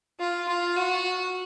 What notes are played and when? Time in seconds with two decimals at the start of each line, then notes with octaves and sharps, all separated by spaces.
0.20 F4
0.48 F4
0.76 F#4